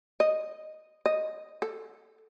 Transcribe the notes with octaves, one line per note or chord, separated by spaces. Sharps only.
D#5
D#5
A4